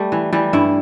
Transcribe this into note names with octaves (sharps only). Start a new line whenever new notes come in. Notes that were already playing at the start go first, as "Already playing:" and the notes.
Already playing: G3 A3
E3
E3 G3
G2 E4